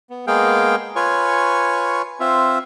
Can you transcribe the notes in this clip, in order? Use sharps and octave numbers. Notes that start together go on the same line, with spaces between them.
B3
G#3 A#3 B3 G#4 F5 G5
F4 B4 C#5 G#5 C#6
C4 F4 E5